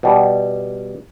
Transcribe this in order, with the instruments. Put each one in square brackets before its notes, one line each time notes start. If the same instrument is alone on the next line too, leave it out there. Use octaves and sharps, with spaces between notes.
[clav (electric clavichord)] B2 G3